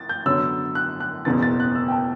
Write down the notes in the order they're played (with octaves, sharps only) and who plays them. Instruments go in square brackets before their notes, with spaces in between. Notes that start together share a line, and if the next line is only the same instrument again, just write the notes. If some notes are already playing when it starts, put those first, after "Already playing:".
Already playing: [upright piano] A6
G6
[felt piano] F#2 D3 F#3 B3 [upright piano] E6
[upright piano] F#6
F#6
[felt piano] F#1 E2 B2 [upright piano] A6
[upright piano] A6
F#6
E6
G5
A5